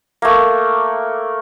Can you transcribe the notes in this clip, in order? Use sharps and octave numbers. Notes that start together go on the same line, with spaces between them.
A3 A#3